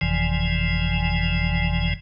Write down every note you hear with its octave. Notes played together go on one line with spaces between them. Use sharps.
G1 F2 C3 E3 F3 G#5